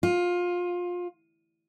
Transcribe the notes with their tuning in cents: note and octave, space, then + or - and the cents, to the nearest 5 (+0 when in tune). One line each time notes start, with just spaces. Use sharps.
F4 +20